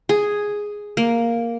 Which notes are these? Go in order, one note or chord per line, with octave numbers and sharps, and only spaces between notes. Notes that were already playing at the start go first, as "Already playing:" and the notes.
G#4
A#3